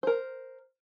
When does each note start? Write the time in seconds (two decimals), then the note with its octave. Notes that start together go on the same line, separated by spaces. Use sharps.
0.03 A#4 C5